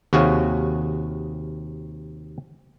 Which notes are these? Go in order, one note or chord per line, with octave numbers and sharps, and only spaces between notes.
D#2 C3 F#4 G#4 C#5 F5